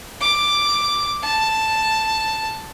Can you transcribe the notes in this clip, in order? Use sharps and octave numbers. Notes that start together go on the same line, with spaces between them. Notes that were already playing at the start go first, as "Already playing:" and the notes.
D6
A5